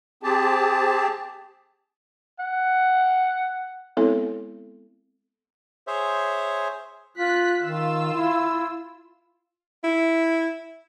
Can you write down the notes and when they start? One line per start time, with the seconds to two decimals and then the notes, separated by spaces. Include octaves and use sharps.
0.23 C4 G4 G#4 A5
2.40 F#5
3.97 G#3 B3 C4 E4 A4 C#5
5.87 G#4 C5 C#5 E5
7.18 F4 F#6 B6
7.63 D#3 F4 E6
8.13 E4
9.84 E4